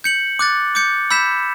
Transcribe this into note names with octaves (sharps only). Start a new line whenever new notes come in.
G6 C#7 F#7
D6 F#6 A6
D6 G6 C#7
B5 E6 G6 B6 E7